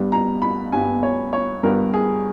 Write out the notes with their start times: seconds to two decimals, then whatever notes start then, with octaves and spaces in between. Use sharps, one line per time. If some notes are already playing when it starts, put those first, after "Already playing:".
Already playing: G2 G3 B3
0.12 A#5
0.42 B5
0.72 G2 G3 B3 G#5
1.03 C#5
1.33 C#5
1.63 G2 G3 B3 A#4
1.94 G#4